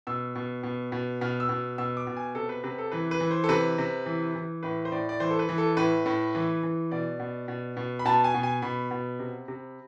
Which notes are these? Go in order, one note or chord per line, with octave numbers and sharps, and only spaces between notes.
B2 E6
B2
B2
B2
B2 F6
E6
B2
B2 E6
D6
B2
G#5
C3 A4
B4
C3 B4
A4
E3 B4
B4
E3
C5
A4
C3 B4
C3
E3
E3
A2 B4
C5
A2 D5
D5
E3 C5
A4
B4
E3
A4
A2 B4
A2
E3
E3
B2 D5
B2
B2
B2
B5
B2 A5
G#5
B2
G#5
B2 B5
B2
C3
C3